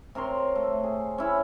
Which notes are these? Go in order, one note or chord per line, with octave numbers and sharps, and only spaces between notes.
C3 A#4 C#5 C6
A3
G#4
C#4 E4 B5